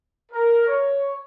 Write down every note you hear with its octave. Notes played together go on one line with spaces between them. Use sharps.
A#4
C#5